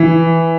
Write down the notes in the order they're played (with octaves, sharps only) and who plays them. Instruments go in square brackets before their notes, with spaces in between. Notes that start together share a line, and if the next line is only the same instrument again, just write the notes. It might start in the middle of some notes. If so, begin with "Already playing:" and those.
Already playing: [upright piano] E3